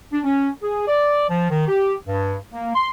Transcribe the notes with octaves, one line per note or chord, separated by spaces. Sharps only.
D4
C#4
G#4
D5
F3
D#3
G4
G2
A#3
C6